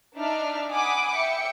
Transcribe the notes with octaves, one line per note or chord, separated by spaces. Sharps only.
D4 D#4 D5 E5 F6
F#5 G#5 B5 D6 D#6
E5 G5 C#7